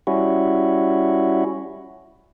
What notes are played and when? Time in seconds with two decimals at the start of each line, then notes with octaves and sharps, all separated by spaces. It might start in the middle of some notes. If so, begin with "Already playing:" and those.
0.07 G3 C#4 E4 F#4